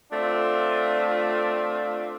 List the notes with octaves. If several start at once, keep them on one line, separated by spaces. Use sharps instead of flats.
A3 C4 D4 F4